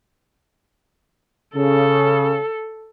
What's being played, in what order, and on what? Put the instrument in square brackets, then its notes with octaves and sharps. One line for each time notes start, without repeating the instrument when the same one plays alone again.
[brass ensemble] C#3 [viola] A4